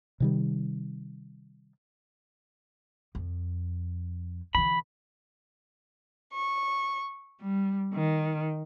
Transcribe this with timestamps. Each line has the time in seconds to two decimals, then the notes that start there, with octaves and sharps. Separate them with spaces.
0.20 C3 D#3 G3
3.15 F2
4.55 D3 E3 B5
6.33 C#6
7.40 G3
7.94 D#3